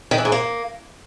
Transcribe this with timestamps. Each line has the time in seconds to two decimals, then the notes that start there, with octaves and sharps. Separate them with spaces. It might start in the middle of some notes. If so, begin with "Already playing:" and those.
0.11 D#3
0.18 E3
0.25 G#2
0.32 A#3